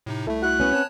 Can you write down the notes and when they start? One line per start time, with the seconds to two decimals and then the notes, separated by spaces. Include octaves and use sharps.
0.06 A2 C3 D#4
0.27 C2 A3 E4 A4
0.42 E4 F#4 F#6
0.60 B3 C#4
0.73 C4 C#5 A5